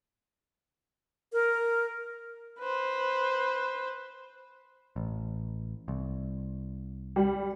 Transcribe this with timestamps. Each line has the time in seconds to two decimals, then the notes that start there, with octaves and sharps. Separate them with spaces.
1.33 A#4
2.60 B4 C5
4.96 A1
5.88 C2
7.16 G3